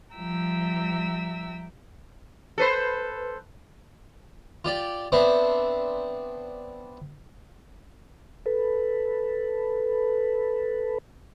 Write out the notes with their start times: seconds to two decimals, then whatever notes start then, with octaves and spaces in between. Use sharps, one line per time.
0.14 F3 G3 E5 G5 A#5 E6
2.58 A4 B4 C5
4.65 F4 G4 D5
5.12 B3 C4 D4 C5 E5
8.46 A4 B4